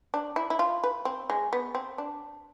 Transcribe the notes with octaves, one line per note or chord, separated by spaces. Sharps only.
D4
E4
E4
F4
B4
C4
G#3
B3
C4
D4